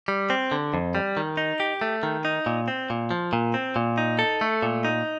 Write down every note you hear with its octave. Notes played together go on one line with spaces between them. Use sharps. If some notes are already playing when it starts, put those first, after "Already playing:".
G3
C4
D3
F2
G3
D#3
D#4
G4
A3
D#3
D#4
A#2
C4
A#2
F3
A#2
C4
A#2
D#4
A4
A3
A#2
D#4